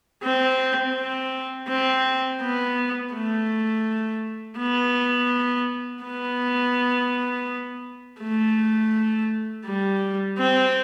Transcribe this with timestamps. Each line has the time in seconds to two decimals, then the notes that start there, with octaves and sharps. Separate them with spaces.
0.23 C4
0.95 C4
1.68 C4
2.41 B3
3.13 A3
4.57 B3
6.04 B3
8.21 A3
9.65 G3
10.38 C4